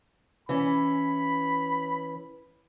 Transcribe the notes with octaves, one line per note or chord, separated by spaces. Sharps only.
E3 C#4 B5